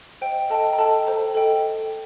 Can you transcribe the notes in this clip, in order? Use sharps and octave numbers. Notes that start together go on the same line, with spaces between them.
C5 D#5 G5
A4 D#5 G5 A5
A#5
A4 D#5 G5 A5
A4 C5 G5 A#5
A4 D#5 G5